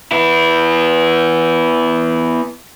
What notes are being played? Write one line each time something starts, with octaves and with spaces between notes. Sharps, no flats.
B3 E4